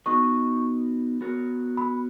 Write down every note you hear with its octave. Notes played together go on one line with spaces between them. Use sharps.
B3 D#4 F#4 B4 D#5 C#6
B3 F#4 A#4 C#5
B5